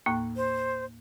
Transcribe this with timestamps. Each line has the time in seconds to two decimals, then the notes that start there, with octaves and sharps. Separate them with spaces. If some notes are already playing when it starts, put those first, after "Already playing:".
0.06 D#2 A2 A#3
0.36 C5